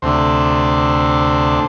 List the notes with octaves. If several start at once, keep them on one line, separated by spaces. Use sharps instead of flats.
D2 C3 A3 D4 C5